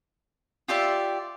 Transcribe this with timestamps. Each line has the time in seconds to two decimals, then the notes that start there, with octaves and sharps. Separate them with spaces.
0.68 F4 G4 D5 E5